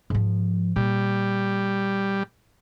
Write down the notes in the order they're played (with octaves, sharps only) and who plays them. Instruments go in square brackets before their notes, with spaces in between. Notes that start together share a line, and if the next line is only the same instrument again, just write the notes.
[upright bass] G#2 F3
[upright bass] A#2 [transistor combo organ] G3